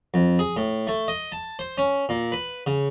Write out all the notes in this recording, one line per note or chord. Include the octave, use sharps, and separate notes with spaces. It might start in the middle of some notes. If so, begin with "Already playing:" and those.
F2
G#4
A2
A3
D#5
A5
C5
C#4
A#2
B4
C#3